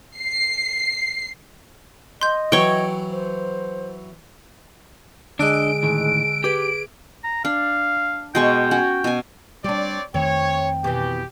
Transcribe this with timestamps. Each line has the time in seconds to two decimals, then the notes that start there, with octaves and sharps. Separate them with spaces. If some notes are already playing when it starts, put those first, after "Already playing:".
0.19 C7
2.21 D#5 C6 G6
2.52 E3 F#3 C#5 G5
3.11 C5
5.39 D3 G#3 D4 D#5 E6 F#6 D7
5.83 A2 D#3
6.44 G4 G#4 B4 D6
7.24 A#5
7.45 D4 F5
8.35 B2 G#3 G5 C#6
8.71 C#4 F#4
9.04 B2 G#5
9.64 G3 C4 D4 G4 C#5 D5
10.14 F2 D#3 A3 C4 C#5 G5
10.84 B2 E3 G4